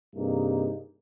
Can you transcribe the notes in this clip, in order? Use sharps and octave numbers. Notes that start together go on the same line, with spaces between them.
G2 C3 A#3 D#4 G#4